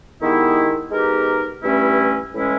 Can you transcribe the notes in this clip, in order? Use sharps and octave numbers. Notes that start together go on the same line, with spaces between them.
D#3 G#3 B3 E4 G4
G#3 B3 D#4 G4 A#4
G2 E3 A3 C#4 E4
A2 E3 G#3 C#4 E4